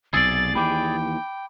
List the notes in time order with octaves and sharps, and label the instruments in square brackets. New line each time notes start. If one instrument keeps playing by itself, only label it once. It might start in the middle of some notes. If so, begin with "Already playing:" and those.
[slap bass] B1 C3 [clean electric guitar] G#4 D5 [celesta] E6 [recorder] A6
[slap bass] D#2 E3 [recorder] G5 [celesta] B5 D6